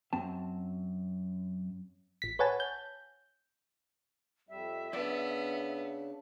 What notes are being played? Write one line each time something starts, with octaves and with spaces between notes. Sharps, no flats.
F#2 C4 A5
A1 B6
B4 C#5 F#5 G#5 A5
G6
F2 G3 E5
C#3 B3 D4 D5